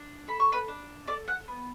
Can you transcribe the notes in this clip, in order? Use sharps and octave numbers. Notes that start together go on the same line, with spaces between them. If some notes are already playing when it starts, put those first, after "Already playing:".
Already playing: D4
A4 B5
C#6
B4 B5
D4
A4 D5 D6
F#5 F#6
B3